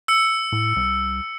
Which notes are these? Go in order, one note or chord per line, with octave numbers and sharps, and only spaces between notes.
E6 C#7
A2
C2